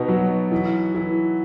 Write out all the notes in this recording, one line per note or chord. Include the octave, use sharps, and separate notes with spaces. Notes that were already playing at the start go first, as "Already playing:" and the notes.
Already playing: B2 B3 D#4
F#3
E3
E3